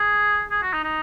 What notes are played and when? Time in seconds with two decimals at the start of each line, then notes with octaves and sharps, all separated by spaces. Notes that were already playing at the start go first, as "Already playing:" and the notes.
Already playing: G#4
0.51 G#4
0.62 F#4
0.73 D#4
0.84 D#4